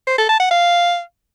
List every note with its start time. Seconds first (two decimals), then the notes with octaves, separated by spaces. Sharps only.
0.07 C5
0.18 A4
0.29 A5
0.40 F#5
0.51 F5